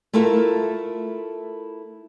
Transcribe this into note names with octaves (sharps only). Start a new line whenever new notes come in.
A3 E4 F4 A4 A#4 E5